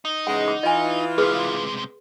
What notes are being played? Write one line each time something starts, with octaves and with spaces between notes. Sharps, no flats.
D#4
C#3 E3 G#3 F#5
D6
E3 F4 D#5 G#5
C3 G#3 G#4 B4